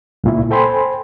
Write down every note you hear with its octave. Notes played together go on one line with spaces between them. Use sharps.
C#2 A#2 E4
A4 C5 G5 G#5 B5 C6